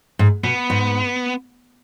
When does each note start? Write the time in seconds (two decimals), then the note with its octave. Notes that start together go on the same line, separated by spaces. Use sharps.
0.19 G#2
0.43 B2 B3
0.70 G#2